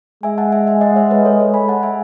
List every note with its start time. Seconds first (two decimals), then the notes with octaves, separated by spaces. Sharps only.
0.23 G#3 E5 G#5
0.38 F#5 A5
0.52 E5 G#5
0.67 E5 G#5
0.81 D#5 F#5
0.96 C#5 E5
1.10 B4 D#5
1.25 A4 C#5
1.39 A4 C#5
1.54 G#5 B5
1.68 F#5 A5
1.83 E5 G#5